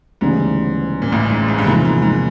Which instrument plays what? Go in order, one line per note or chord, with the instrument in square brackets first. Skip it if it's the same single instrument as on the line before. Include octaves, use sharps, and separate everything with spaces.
[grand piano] D2 C#3 E3 G3 B3 [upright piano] G#2
[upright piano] A#2
A1 A2
G#2
G#2
G2
[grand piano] E2 C3 F3 A#3 [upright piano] G#2
[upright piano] G#2
G#2